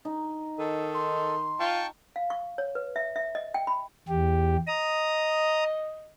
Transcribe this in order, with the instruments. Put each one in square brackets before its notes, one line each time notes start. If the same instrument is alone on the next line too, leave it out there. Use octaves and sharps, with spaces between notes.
[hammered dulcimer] D#4
[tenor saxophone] D#3 [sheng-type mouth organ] A4
[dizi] C6
[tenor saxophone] F4 [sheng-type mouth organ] G5 A5 C#6
[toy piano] F5
C#6
C#5
B4
E5
E5
D#5
G5
B5
[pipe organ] E2 G4
[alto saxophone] D#5 [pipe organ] A#5 D#6